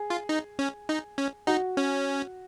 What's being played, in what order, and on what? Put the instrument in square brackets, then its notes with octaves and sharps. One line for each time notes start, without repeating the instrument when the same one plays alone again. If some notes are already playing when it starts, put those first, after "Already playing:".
Already playing: [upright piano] G#4
[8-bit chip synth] F4
D#4
C#4
D#4
C#4
[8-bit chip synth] D#4 [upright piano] F#4
[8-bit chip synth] C#4